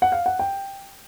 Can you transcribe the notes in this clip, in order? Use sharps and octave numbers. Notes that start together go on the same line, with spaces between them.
F#5
F5
F#5
G5